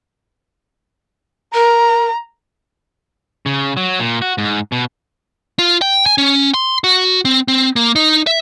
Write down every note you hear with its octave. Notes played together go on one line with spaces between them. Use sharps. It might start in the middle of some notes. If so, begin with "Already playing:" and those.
A#4 A#5
C#3
F#3
A#2
F#4
G#2
B2
F4
G5
G#5
C#4
C6
F#4
C4
C4
A#3
D#4
E5